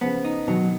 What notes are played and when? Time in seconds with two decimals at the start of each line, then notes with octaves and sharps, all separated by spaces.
0.01 C#3 F3 B3
0.25 D#4
0.48 B2 D#3 F#3